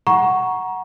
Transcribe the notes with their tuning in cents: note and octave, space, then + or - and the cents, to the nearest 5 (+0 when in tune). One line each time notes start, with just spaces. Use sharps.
F#5 +0 A#5 +25 C#6 +0